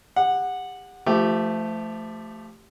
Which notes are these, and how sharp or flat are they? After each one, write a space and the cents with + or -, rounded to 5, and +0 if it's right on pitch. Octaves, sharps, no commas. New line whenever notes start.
G4 +35 F#5 -10
F3 -25 A3 +0 G4 +0